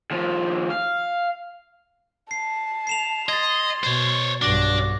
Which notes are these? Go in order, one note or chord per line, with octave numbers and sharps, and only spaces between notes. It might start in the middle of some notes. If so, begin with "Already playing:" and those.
D#2 F3
F5
A5 C7
C7 E7 F7
D#5 C6 G#6 A6
B2 C5 C#5
B1 G2 D4 F#4 D6 A#6